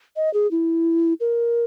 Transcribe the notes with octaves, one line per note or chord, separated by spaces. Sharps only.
D#5
G#4
E4
A#4